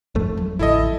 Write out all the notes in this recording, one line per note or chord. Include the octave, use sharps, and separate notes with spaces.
G#1 F2 A3
F#3 D4
A1 D3 E4 A4 D#5